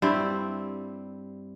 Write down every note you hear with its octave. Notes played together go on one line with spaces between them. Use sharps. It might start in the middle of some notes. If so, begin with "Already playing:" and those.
G2 G3 C4 E4